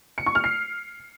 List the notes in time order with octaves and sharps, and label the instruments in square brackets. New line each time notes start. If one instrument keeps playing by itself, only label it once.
[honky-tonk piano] C#7
C#6
F6
C7